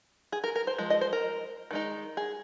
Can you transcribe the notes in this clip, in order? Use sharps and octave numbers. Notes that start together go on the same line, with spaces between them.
G#4
A#4
A#4
C5
F3 G#3
D#5
C5
A#4
D#3 G#3 D#4
G#4